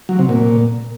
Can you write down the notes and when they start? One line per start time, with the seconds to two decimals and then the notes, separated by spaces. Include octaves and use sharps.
0.09 F#3
0.19 C3
0.29 A#2